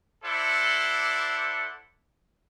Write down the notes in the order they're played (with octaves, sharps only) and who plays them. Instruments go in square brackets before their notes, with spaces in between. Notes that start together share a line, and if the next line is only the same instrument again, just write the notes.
[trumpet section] E4 A4 C5 D5 F#5